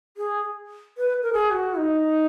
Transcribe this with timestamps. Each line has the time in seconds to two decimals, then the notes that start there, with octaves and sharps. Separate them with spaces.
0.17 G#4
0.97 B4
1.23 A#4
1.33 G#4
1.51 F#4
1.78 D#4